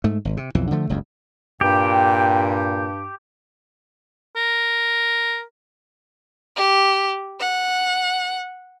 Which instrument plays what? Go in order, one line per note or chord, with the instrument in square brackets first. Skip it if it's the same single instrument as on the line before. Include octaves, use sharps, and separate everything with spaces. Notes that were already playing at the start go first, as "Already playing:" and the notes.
[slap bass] G#2 A3
G#1
C3
B1 F2 E3
D3 F3 A3
F#1 C#2 G2
[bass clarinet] G2 [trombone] A#2 [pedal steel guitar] G4 [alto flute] G5
[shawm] A#4
[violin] G4
F#5